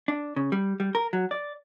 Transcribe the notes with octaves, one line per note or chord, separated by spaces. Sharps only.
D4
C#3
G3
G3
A#4
F#3
D5